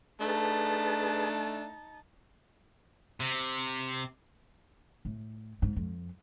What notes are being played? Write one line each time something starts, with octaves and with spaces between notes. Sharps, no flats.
A3 D4 D#4 G#4 B4 A5
C3
A2
G#2
F2